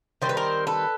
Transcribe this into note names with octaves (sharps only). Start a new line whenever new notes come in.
D#3 G3 C4 C5
B4
A#4 C5
A4 B4